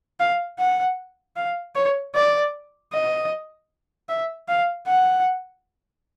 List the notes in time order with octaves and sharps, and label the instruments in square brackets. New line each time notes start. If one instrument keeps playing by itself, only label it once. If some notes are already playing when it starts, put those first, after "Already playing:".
[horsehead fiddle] F5
F#5
F5
C#5
D5
D#5
E5
F5
F#5